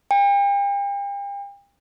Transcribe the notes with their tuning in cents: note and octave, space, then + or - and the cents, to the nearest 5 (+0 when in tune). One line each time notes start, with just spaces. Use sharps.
G5 +40